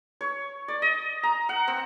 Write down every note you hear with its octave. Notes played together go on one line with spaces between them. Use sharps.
C#5
D5
D#5
A#5
F#5
C4